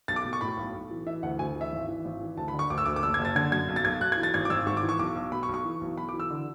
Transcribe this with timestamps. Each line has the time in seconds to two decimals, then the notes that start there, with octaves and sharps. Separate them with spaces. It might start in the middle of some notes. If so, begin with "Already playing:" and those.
0.08 B1 A6
0.16 D6
0.25 B2
0.33 C#6
0.41 A2 B5
0.57 B1
0.74 B1
0.91 E3
1.06 E3 E5
1.23 D2 F#5
1.39 D2 G#5
1.56 E3
1.61 E5
1.72 G#1
1.88 E3
2.05 G#1
2.21 E3
2.37 D2 A5
2.48 B5
2.53 D3
2.59 C#6
2.70 D2 D6
2.78 E6
2.86 D2 D6
2.96 D6
3.03 F#1 E6
3.14 G#6
3.19 F#1
3.25 A6
3.35 D3 G#6
3.52 F#2 G#6
3.69 B1
3.76 A6
3.85 B1 G#6
4.01 B1 F#6
4.12 G#6
4.17 E3
4.23 A6
4.34 G#1 G#6
4.45 D6
4.50 G#1 E6
4.66 G#2 C#6
4.77 D6
4.83 E3
4.89 C#6
4.99 B1 D6
5.15 B1
5.32 B2 B5
5.43 C#6
5.49 B1
5.54 C#6
5.65 E3
5.81 B1
5.98 B1 B5
6.09 D6
6.14 E3
6.20 E6
6.30 D3